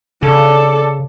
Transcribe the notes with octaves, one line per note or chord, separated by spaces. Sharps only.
C#3 A4 D5